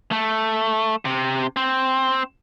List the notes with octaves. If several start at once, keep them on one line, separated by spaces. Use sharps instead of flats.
A3
C3
C4